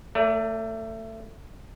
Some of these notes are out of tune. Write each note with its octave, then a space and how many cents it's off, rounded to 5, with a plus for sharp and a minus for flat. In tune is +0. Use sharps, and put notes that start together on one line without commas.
A3 +20 A#4 -35 D5 -30